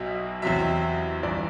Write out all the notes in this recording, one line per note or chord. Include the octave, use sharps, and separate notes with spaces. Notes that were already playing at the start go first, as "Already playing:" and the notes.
Already playing: B1 B2 F#3 E5
E2 C3 F#3 E5
G1 G2 E3 D5